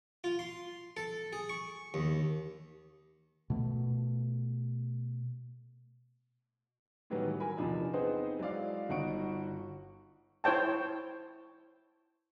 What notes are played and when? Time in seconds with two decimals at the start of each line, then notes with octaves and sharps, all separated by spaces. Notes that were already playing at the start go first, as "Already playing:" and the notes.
0.24 F4
0.39 C6
0.97 A4
1.33 G#4
1.49 C#6
1.94 D#2
3.50 B2 A3
7.10 A2 D#3 E3 F#3 G3 B3
7.40 A#4 G#5 B5
7.57 E2 C3 F3 D4 D#4
7.93 B3 C4 D#4 G#4 B4 C5
8.39 F#3 G#3 E4 D5 F5
8.89 G1 D#4 F#4 F#5 C#6 D7
10.44 E4 C5 C#5 G5 A5